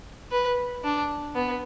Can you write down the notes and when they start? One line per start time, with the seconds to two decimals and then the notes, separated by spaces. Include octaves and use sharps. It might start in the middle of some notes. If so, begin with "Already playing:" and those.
0.31 B4
0.84 D4
1.35 B3